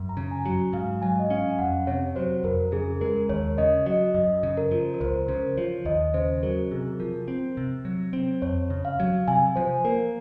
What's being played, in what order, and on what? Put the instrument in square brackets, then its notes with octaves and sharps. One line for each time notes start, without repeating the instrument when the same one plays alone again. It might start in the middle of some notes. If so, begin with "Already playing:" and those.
Already playing: [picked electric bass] F#2
[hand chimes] A#5
[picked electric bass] C#3
[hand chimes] G#5
[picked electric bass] F#3
[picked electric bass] G#2 [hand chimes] F5
[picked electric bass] F#3 [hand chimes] G#5
[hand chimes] D#5
[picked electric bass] C#4 [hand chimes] F5
[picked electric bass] F2 [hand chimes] F#5
[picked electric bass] C3 [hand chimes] C#5
[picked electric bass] F#3 [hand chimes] C5
[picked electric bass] F2 [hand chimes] A#4
[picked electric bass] C#3 [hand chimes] G#4
[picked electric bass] G#3 [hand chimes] A#4
[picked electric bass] D#2 [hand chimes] C#5
[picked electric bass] C#3 [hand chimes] D#5
[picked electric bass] F#3 [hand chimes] D#5
[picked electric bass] F#2 [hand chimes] D#5
[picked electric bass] C#3
[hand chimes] A#4
[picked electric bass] F3
[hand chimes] A#4
[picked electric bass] C#2 [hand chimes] C5
[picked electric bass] C#3 [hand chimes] C5
[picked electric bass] F3 [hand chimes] C#5
[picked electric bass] D#2 [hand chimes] D#5
[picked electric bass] C#3 [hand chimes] C5
[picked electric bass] F#3 [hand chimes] A#4
[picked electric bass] C3 [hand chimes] G#4
[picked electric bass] F3 [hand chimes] A#4
[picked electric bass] C4
C3
F#3
C4
[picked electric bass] F2 [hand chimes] C#5
[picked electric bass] C#3
[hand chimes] F5
[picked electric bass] F#3
[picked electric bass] C3 [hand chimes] G#5
[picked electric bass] F3 [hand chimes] C5
[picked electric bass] A#3 [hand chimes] A#4